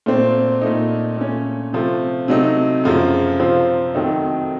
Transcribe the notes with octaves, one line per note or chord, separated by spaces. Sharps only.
A#2 A3 C4
A#2 A3 D#4
A#2 A3 C#4
C3 F3 A3
C3 F#3 A3 D#4
F#2 C#3 F3 A3
C3 F3 C4 F4
F2 D#3 F#3 A3 D#4